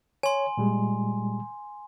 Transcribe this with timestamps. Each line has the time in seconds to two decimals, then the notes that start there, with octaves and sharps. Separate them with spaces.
0.23 C#5 G#5 C6
0.57 A#2 G3 G#3